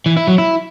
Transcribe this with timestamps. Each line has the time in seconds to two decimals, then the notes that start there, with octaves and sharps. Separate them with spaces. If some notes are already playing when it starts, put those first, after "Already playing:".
0.06 E3
0.17 E4
0.28 F#3
0.38 E4